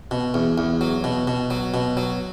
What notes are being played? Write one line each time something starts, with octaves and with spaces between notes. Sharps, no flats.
B2
E2
E2
F#3
B2
B2
F#3
B2
F#3